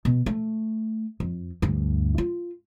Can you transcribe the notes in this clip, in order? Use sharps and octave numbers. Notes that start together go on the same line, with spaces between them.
B2
A3
F2
D2 G2
F4